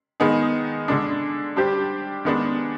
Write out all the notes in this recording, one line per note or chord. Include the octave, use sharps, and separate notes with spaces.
D#3 G#3 B3 D#4 G#4
D3 G#3 D4
G3 D4 G4 C5
D#3 G#3 B3 D4